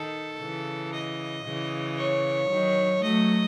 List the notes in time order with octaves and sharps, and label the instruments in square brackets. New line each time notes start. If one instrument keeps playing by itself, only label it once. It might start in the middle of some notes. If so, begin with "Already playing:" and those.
Already playing: [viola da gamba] D#3 [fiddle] A4
[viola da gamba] C#3 E3
[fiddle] D#5
[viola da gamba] C#3 E3
[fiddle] C#5
[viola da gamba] D#3 F#3
[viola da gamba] F#3 A3 [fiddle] D#5